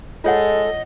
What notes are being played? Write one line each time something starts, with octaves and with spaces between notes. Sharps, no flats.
G#3 F4 A4 C#5 D#5 F#5